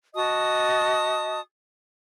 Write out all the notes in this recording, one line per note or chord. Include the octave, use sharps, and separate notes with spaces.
F#4 D#5 A5 D#6